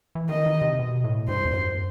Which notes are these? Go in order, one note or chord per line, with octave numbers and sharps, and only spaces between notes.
E3
D#3 D#5
D#3
C3
B2
A2
G2 C5
E2
F#2